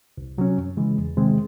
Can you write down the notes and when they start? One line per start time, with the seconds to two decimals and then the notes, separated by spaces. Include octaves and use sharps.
0.18 C2
0.38 C3 F#3 C#4
0.57 F#2
0.77 C#3 E3 G#3
0.98 E2
1.17 C3 D#3 G#3 C4